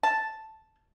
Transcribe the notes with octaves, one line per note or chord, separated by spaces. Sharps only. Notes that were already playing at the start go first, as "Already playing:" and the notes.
A5